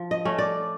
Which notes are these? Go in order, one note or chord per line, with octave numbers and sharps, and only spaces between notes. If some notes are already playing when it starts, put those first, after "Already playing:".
Already playing: F3
D#5
A3 C#4
D5